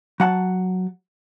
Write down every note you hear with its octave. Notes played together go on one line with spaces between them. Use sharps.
F#3 F#5 A5